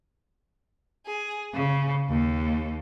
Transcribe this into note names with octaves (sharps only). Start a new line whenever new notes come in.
G#4
C#3
D#2